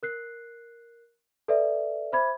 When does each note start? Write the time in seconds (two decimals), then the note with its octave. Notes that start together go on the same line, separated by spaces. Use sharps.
0.03 A#4 F#6 C7
1.48 A4 B4 D5 E5
2.12 C5 E5 B5 D6 G#6